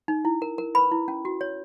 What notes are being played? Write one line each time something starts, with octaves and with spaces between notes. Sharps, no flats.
D#4
E4
A#4
A#4
B4 B5
E4
C#4
F#4
C#5